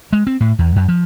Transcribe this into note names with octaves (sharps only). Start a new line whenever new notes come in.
G#3
C4
A2
E2
F#2
F3